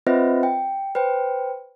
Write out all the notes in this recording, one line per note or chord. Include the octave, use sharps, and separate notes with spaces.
C4 F4 B4 C5 D#5 E5
G5
B4 C5 G5